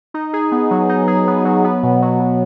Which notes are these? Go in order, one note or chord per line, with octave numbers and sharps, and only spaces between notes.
D#4
G#4
B3
F#3
D#4
G#4
B3
F#3
B3
B2
F#3
B2